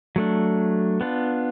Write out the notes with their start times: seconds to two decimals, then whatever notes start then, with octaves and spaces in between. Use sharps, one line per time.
0.16 F#3 A3 D4
1.01 B3 D4 F4